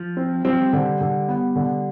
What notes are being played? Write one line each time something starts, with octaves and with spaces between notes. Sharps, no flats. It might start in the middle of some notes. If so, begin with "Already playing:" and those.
Already playing: F3
C4
G3 C4
F3
G3
D3
D3
B3
D3